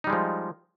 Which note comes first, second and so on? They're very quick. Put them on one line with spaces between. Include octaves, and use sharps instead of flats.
D#4 G3 G#3 F3